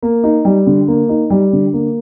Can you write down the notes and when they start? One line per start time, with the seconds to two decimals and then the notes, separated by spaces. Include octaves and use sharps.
0.03 A#3
0.24 D#4
0.45 G3
0.67 D3
0.88 A#3
1.09 D#4
1.30 G3
1.53 D3
1.73 A#3